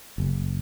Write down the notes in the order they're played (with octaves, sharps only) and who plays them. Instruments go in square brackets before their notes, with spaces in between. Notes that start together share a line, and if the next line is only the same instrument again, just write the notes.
[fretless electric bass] F#1